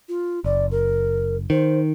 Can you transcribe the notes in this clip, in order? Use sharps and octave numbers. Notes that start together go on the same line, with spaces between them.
F4
F#1 D5
A#4
D#3 C5